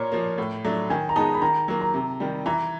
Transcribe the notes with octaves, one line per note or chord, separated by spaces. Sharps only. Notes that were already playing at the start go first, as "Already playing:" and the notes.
Already playing: A#2 A#4 C#5
F3 A#3
A2
F#3 A3 D4
D#3 G#5
A#5
G#3 B3 D#4 A5
B5
D#3 A#5
F#3 A#3
A#5
C3
D#3 G3
E3 A#5